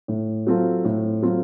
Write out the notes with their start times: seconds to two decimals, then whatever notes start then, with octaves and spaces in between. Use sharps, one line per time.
0.08 A2
0.47 F#3 C4 F4 A4
0.85 A2
1.22 F#3 C4 F4 A4